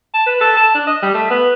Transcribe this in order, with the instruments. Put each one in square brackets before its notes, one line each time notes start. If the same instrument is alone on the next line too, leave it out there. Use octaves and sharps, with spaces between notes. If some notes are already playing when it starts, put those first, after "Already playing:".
[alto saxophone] A5
B4
A4
A5
D4
D#5
G3
A3
B3